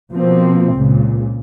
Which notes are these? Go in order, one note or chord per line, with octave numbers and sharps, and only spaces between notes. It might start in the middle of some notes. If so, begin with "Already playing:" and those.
B2 F3 A#3 C4
C#2 A#2 C#3